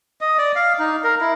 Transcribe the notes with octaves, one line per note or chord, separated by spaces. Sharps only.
D#5
D5
F5
D#4
A#4
E4